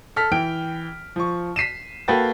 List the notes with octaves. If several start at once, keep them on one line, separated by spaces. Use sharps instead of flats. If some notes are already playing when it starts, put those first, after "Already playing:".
A4 F6 B6
E3 G5 D7
F3 C#6
B6 C7 D#7 E7
A#3 F#4 A4 B4 G5 A6